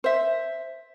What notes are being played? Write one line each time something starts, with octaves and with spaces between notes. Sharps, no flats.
C5 E5